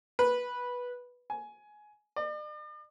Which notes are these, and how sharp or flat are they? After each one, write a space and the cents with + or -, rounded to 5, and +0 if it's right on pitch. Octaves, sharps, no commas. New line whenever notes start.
B4 -10
G#5 +15
D5 +45